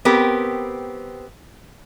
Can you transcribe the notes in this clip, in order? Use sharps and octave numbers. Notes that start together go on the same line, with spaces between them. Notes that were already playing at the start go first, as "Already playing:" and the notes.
B3 C4 G4 A#4